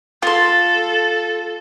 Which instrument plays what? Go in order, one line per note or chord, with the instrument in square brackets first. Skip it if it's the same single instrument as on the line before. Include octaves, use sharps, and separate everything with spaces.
[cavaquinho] F4 C6 [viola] A4